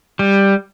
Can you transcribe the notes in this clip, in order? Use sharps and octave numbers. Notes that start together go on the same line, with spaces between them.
G3